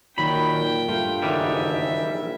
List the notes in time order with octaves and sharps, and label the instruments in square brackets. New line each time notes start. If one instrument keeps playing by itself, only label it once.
[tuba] A#2 [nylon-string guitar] D#3 F#3 [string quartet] G5 [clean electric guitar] B5
[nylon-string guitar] G2 A3 F4
[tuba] F#1 [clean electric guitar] D#3 E3 G3 [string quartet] E5
[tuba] A#1